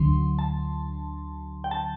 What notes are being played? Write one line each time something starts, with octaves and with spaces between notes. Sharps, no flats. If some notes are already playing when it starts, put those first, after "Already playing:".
Already playing: D2 D3 F#3 C6
A5
G5
A5